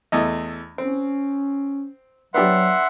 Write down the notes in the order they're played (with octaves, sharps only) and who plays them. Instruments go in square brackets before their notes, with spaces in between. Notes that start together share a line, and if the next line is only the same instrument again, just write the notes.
[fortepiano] E2 A3 D#5
[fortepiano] C4 [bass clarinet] C#4
[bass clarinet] F#3 [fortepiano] B3 D4 G4 [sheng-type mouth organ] E5 F#5 C6